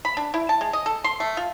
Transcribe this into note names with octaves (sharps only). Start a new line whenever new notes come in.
B5
D4
E4
A5
G#3
D#5
A4
C6
A3
F4